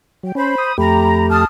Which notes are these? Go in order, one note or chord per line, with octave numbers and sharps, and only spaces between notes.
F#3 G5
C#4 C5 B5
D#6
F2 A3 G4 A#5 B5
A5 D#6 F6